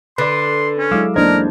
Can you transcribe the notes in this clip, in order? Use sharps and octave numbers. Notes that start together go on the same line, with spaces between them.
D3 B4 D5 C6
C#4
F#3 G#3 E4 F5 D6 E6
E2 A#3 D4 D#4 A#4 C5 G#6